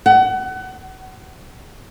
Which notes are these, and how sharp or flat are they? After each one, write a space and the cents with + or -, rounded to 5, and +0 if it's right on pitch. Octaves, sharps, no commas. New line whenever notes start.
F#5 +30